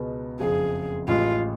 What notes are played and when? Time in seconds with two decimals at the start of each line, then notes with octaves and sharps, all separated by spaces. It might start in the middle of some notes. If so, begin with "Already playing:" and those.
Already playing: C#2 B2 G#3 B3 F#4
0.40 F#1 F2 F3 G#4
1.07 A1 A2 G#3 F4